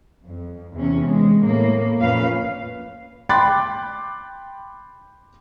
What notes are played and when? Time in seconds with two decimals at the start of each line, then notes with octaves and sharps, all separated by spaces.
0.25 F2
0.74 E2 C3 C#4
1.06 G#3
1.40 A2 A#3
2.00 F2 A#2 C#4 B4 F5
3.29 G5 B5 C6 D6 F#6 A6